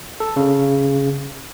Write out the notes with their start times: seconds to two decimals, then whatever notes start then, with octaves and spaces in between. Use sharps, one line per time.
0.20 A4
0.36 C#3